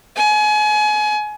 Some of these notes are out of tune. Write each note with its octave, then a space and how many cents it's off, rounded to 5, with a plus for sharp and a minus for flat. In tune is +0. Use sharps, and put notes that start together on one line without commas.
G#5 +30